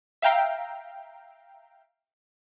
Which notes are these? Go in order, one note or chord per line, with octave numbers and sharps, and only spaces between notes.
E5 F5 G5 A#5